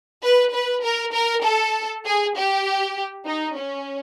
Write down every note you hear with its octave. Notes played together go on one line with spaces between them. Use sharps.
B4
B4
A#4
A#4
A4
G#4
G4
D#4
C#4